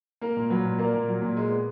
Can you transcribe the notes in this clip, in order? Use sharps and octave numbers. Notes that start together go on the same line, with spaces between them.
A#3 A#4
A#2
F#3 B4
A#2
A#3 A#4 D5
A#2
F#3
A#2
G#3
B3